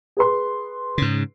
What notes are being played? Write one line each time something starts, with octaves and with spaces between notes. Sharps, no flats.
G#4 B4 C6
G#2 C#3